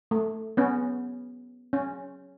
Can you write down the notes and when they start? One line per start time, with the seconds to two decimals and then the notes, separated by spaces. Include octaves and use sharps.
0.11 A3
0.57 B3 C#4
1.73 C#4